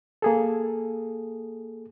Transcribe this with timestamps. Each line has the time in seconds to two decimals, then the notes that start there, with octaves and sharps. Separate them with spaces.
0.22 A#3 G#4 A4